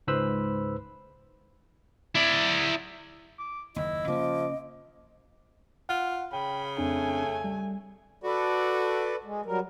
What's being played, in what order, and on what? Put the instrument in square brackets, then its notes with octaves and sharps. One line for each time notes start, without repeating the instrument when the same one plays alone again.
[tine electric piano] C#2 G#2 B4 C5 B5 E6
[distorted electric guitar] E4 D5
[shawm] D6
[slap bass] F#1 D#2 [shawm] E4 [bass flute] D#5
[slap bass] C#3 A#3 C#4 [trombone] F3 [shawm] D6
[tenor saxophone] F4 [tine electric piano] F#5
[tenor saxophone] C#3 [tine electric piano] G5 [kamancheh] B5
[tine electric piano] F2 C4 D4 [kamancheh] A3 G#5
[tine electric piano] G3
[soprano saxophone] F#4 [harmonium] A4 B4 D5
[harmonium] G#3
F#3 G3 A#4